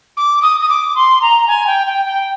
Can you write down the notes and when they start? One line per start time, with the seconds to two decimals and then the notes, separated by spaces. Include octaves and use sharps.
0.17 D6
0.42 D#6
0.60 D#6
0.69 D6
0.95 C6
1.21 A#5
1.47 G#5
1.66 G5
1.86 G5
2.05 G5